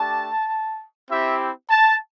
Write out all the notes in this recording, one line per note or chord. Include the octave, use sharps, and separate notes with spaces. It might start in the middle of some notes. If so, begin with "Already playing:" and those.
Already playing: A3 D4 G4 A5
C4 E4 G4 E5
A5